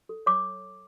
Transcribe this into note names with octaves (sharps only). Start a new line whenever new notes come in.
A4
C#5 D6